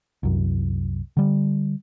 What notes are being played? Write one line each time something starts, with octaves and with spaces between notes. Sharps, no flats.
C2 F#2
D3 G3